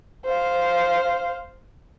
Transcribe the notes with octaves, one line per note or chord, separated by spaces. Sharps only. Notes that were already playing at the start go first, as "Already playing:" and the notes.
C5 F5